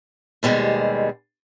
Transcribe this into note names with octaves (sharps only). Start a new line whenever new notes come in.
D#2 B2 G3 G#3 C5